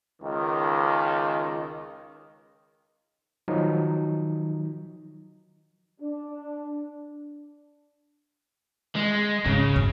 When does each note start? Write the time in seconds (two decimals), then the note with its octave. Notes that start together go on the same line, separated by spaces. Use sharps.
0.22 C#2 D#3
3.48 D#3 F3 F#3 D#4
6.01 D4
8.96 G#3
9.46 G#2 C#3
9.76 F#2